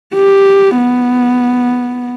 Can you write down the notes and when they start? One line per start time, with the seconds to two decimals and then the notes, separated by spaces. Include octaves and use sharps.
0.14 G4
0.77 B3